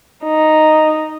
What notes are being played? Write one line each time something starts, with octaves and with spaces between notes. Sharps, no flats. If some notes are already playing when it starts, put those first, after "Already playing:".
D#4